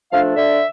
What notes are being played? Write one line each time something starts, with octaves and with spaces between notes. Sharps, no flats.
F3 A3 D4 F5
D3 E5